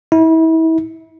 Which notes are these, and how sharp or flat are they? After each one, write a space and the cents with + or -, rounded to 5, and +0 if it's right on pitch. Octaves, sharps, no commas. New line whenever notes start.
E4 -35